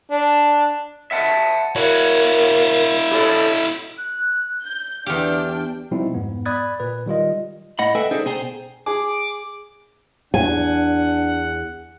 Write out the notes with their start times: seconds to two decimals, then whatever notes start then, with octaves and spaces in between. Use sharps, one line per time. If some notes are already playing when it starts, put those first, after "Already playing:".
0.11 D4
1.11 E5 F#5 A5
1.76 E4 F#4 A#4 C#5
3.12 G4 A4 C#5 B5
3.98 F#6
4.63 G6
5.06 E2 D4 G4 G5 F6
5.91 B2 F3 G3 C4 D#4 E4
6.15 F2 G#2 B3
6.45 D5 B5 D#6 F#6 G#6 A6
6.80 A#2 B4
7.06 D#3 G3 F4 D#5
7.79 A2 D#5 F#5 B5
7.95 A4 B4 D#5 E5 G5 G#5
8.11 C#4 D#4 G#4 A4 C5 D5
8.25 B2 G#4 C5 G5 A#5
8.86 G#4 D6
10.34 E2 D4 F#5 G#5